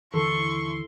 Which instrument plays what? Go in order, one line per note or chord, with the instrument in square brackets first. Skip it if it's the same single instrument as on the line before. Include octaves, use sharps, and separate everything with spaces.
[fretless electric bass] D#2 D3 E3 [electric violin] E4 C6 [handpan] A4 [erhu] C#6